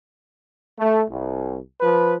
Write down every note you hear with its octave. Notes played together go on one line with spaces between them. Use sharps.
A3
C2
F3 B4